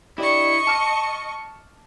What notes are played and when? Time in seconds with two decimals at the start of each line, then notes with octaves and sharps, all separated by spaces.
0.18 D4 E4 G4 D#5 C#6
0.67 A5 D6 F6